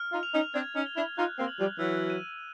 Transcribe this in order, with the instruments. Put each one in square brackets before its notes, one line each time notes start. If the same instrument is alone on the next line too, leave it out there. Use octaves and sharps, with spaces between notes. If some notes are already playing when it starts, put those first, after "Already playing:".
Already playing: [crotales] F6
[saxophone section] D#4 F4
[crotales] F7
[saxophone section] C#4 D#4
[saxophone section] C4 D4 [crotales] G#6
[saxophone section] C#4 D#4
[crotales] G7
[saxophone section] D4 E4
[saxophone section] D#4 F4 [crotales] F#6
[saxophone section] A#3 C4
[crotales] F#7
[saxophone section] F3 G3
[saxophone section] E3 F#3 [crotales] E6
[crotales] D#7